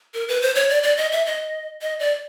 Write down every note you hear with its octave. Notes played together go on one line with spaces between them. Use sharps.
A#4
B4
C5
C#5
D5
D5
D#5
E5
D#5
D#5
D5